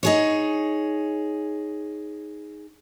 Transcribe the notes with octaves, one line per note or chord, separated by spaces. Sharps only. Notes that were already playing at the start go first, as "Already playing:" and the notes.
D#4 G#4 C#5